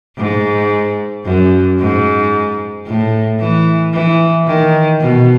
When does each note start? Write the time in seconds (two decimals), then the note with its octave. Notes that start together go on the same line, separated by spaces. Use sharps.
0.18 G#2
1.25 F#2
1.79 G#2
2.87 A2
3.40 E3
3.93 E3
4.47 D#3
5.01 B2